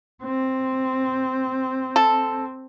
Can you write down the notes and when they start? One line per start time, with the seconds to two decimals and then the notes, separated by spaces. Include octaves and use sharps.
0.23 C4
1.96 A4